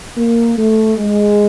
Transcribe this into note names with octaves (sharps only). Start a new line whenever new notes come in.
A#3
A3
G#3